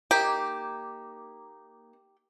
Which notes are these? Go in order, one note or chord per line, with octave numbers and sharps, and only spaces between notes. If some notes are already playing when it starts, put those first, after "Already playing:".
A#3 D#4 G4